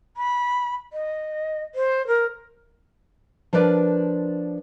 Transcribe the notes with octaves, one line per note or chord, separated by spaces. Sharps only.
B5
D#5
C5
A#4
F3 D4 A#4 B4 D5